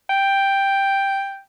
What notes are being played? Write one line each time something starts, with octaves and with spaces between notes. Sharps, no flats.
G5